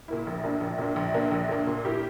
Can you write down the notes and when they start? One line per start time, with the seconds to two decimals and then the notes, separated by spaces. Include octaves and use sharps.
0.08 A#2 A#3 E4
0.27 A#1
0.43 A#2 A#3 D4
0.61 A#1
0.78 A#2 A#3 D4
0.96 A#1
1.14 A#2 A#3 D4
1.31 A#1
1.49 A#2 A#3 D4
1.67 A#2
1.85 A#3 E4 G4